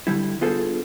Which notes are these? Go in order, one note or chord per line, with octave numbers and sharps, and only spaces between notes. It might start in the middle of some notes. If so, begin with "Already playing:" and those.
D3 G3 E4
B3 D4 F4 G#4 A4 C5